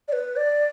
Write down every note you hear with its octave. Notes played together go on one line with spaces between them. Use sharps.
D5
B4
D5